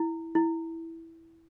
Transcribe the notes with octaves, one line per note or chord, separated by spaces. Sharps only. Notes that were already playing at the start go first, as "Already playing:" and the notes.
Already playing: E4
E4